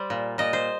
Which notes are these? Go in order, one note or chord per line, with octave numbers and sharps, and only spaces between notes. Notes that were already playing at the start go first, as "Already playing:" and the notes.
Already playing: G3 C5
A#2
A#2 D#5
C5